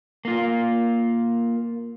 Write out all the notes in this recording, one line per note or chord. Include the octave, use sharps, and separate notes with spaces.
A#3 F4